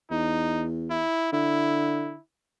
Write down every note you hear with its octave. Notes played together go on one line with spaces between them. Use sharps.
E2 D#4
E4
D3 E4